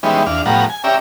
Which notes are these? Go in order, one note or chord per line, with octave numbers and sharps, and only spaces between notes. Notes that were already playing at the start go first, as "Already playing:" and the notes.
E3 G3 G#3 B3 C#4 D#4
E2 D4 F5
A2 F3 G3 B3 F#5 A#5
G#5
C#4 G4 D5 E5 A#5